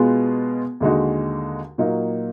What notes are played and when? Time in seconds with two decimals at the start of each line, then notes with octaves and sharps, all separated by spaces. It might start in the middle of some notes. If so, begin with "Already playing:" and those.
Already playing: B2 G#3 B3 F4 G#4
0.80 D#2 D3 G#3 D#4 F#4
1.78 A#2 F#3 A#3 D#4 F#4